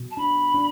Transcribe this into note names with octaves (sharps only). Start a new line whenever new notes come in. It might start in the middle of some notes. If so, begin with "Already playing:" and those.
Already playing: B2
A5
D4 B5
D4